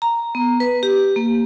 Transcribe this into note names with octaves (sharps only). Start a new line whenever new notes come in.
A#5
B3
B4
G4
A#3